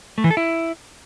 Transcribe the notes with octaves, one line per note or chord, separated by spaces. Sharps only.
A3
E3
A4
E4